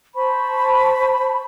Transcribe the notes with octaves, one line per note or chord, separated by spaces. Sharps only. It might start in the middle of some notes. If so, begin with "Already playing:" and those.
C5 A5 B5 C#6